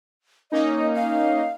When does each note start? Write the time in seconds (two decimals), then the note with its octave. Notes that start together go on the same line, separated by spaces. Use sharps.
0.52 A#3 C#4 D#4 D#5
0.95 F5